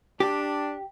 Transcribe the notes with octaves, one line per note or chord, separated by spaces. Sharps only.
D4 G4